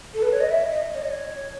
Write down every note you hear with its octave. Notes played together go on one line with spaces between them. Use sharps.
A4
B4
C#5
D#5
E5
D#5
C#5
D#5
C#5